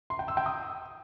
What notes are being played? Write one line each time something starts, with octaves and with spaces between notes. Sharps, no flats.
C6
G5
E6
G5
D#6